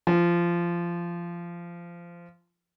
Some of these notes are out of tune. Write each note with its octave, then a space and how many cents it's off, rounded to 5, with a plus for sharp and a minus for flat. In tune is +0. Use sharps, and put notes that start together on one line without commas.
F3 -20